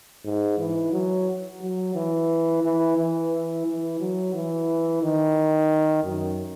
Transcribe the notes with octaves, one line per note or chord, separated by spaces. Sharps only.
G#2
E3
F#3
F#3
E3
E3
E3
E3
F#3
E3
D#3
F#2